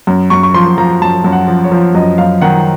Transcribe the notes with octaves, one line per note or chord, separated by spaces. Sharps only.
F#2
F#2 C#6
C#6
F3 C6
F3 A#5
F#2 A5
F#2
F#5
F3
C#5
F3
F#2 D#5
F#2 F5
D#3 F#5